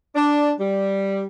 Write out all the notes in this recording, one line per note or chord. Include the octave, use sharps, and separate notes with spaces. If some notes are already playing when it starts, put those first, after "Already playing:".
D4
G3